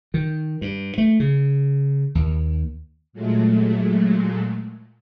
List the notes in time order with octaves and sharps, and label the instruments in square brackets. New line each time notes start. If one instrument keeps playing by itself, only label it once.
[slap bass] D#3
G2
A3
C#3
D#2
[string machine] A#2 F#3 G#3 A3